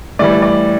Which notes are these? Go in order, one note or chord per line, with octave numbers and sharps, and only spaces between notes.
A2 E3 G3 D5
D5